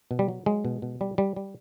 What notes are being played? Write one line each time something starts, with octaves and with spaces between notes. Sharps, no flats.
B2
G3
F#3
F#3 G#3
B2
B2
G3
G3
G3